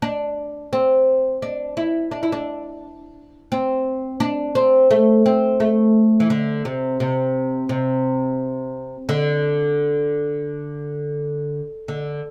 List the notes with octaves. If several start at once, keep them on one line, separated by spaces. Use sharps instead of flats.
D4
C4
D4
E4
D4
E4
D4
C4
D4
C4
A3
C4
A3
E3
D3
C3
C3
C3
D3
D3